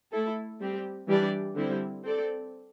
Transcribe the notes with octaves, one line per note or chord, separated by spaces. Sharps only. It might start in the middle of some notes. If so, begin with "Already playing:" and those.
A3 E4 A4
G3 C4 G4
E3 G3 D4 G4 D5
D3 G3 C4 E4
C4 A4 D5